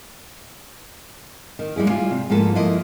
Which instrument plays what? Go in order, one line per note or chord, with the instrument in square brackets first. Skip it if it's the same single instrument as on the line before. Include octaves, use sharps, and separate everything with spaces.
[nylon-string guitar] D#3
D#2 G3 G#3 E4 G#4
G3 F4 G#5
C3
D2 G#2 F3 A#3 A4 B4
G2 F3 A#3 E4 D#5